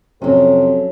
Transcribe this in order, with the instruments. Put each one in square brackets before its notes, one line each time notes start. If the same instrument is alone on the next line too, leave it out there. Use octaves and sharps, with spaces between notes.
[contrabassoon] F2 [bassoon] C3 [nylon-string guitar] F#3 C#4 [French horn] A4